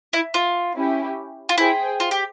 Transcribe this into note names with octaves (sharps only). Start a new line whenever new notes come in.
E4
F4
C#4 E4 G4
F4
E4 G#4 C5 G5
F4
G4